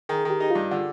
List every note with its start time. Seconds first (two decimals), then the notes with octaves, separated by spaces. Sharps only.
0.09 D#3 G#4
0.25 D#3
0.30 G4
0.40 D#4
0.50 G2 F4
0.71 D3